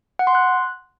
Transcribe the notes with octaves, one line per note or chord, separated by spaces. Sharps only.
F#5
C6
F#6